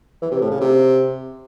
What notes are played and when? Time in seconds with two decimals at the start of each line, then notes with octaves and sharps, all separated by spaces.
0.22 E3
0.31 C3
0.41 A2
0.51 C#3
0.60 C3